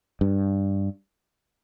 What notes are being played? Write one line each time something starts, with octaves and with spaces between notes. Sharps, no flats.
G2